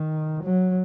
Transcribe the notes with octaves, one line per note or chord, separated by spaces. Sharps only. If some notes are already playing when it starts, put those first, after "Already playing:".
Already playing: D#3
F#3